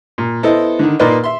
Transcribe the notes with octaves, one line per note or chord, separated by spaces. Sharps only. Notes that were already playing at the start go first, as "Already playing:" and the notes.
A#2
B3 E4 A4 C5 D#5
D3 D#3
A#2 A#3 D#4 B4 D5 C6
E5 C6